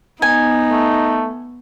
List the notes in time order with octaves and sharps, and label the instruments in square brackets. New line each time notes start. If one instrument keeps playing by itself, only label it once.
[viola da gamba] B3 [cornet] D#4 [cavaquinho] G#5
[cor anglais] A3